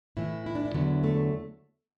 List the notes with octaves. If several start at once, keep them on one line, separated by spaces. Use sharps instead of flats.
A2 E3 E4
E4
D4
E4
E2 D3 F#3
A3